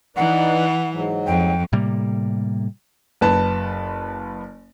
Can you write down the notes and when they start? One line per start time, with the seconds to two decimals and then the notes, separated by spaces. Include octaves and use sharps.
0.17 E3 D#4 B4 D5 F#5
0.92 G#2 F#3
1.26 F2 G5
1.73 A2 C3 G3 A#3
3.21 F#1 B4 A5